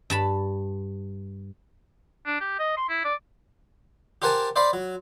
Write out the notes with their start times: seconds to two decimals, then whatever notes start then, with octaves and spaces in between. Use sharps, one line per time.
0.10 G2 A5 B5
2.26 D4
2.41 G4
2.59 D#5
2.77 C6
2.89 E4
3.05 D5
4.22 G4 A#4 C5 F#5 G#5 A5
4.56 C5 D5 F5 B5 C6
4.73 F#3